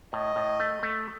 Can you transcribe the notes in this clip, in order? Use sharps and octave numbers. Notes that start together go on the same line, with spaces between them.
A2 D#5
A2
A3
A3